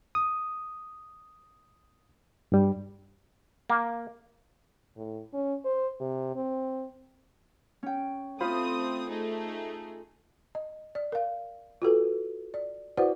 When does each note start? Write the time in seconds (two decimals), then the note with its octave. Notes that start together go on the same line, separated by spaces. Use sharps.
0.15 D#6
2.52 G2 G3
3.70 A#3
4.96 A2
5.34 C#4
5.65 C5
6.00 C3
6.36 C4
7.83 C#4 G5
8.40 A3 C4 F4 C5 B5 D#6
9.09 A3 D#4 G#4
10.55 D#5
10.95 D5
11.12 A#4 F5
11.82 F4 F#4 A4 B4
12.54 D5
12.97 E4 F#4 B4 C5 D5 F#5